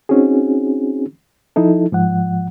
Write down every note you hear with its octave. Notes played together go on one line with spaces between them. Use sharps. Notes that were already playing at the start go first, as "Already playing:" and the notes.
C4 C#4 D#4 F#4 G#4
F3 D#4 E4 A4
G#2 F3 F#5